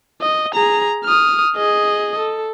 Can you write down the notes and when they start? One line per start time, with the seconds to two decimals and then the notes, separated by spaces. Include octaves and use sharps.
0.21 D#5
0.54 G#4 A#5
1.05 D#6 F6
1.56 G#4 D#5
2.18 A4